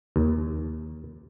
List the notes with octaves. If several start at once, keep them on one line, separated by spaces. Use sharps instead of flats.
D#2